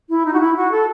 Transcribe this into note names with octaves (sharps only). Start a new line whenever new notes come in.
E4
D#4
F#4
E4
F#4
A4